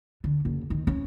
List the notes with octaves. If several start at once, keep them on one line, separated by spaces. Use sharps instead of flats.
D3
F#1
D#3
C#4